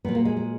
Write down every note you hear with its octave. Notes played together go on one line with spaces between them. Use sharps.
A#2 F#3 B3
A#3
G#3
G#3